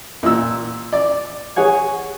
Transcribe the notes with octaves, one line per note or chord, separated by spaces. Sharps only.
A#2 E6
D5
G#4 C#5 F#5 G#5